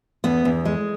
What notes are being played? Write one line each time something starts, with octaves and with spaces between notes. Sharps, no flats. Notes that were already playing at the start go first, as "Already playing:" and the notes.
E2 B3
E2
G#3